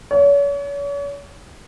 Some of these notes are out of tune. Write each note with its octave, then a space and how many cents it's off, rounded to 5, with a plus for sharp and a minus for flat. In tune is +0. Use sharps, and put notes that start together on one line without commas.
C#5 +40